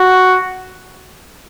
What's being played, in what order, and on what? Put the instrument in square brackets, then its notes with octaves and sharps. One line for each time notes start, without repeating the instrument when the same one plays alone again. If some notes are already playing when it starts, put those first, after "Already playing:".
Already playing: [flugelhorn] F#4